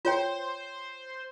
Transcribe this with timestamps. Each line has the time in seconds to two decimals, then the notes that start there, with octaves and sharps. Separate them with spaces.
0.05 F4 C5 C#5 G5